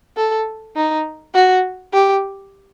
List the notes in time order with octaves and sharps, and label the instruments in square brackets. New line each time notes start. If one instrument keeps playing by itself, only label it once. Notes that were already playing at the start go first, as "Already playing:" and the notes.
[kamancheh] A4
D#4
F#4
G4